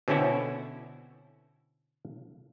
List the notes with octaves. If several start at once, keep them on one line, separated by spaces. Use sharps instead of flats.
B2 D3 C4 C#4 E4 F#4